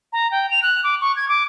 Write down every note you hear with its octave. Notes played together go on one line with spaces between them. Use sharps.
A#5
G5
F7
F#6
D6
C#6
G#6
D6